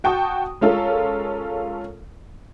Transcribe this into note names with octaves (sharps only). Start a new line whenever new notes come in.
F#4 G5 A5 C#6 D#6
G#3 C#4 F4 A4 A#4